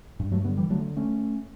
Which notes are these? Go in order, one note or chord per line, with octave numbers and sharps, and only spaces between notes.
G2
F#3 A3
D3 G3 B3
E3 G3
D3 F#3 A3
A3 C#4